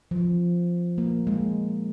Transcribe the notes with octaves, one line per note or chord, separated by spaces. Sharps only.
F3
A#3
G#3